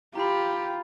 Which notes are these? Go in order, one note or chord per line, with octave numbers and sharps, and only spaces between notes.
F4 G4 A#5 B5